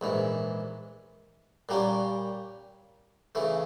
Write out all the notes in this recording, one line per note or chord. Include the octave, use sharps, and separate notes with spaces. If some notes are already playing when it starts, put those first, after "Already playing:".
A#1 G#2 E3
A#2 G3 A#3 C#4
C#3 E3 A3